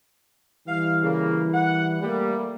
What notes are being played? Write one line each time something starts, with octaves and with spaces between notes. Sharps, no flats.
E3 G3 F5
C#3 A#3
F#5
G3 A3 A#3